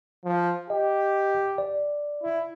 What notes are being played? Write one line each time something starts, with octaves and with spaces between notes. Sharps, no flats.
F3
G4 D#5
D5
E4